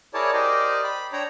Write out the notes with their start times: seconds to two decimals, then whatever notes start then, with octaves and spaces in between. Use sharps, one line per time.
0.14 E4 G#4 A#4 C#5 D5 A5
0.33 G4 A#4 C5 D5 D#5
0.84 B5
1.13 D4 C#5 G5 A#5